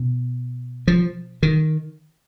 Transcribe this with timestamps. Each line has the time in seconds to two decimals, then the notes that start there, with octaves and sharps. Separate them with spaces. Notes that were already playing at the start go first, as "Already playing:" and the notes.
Already playing: B2
0.88 F3
1.43 D#3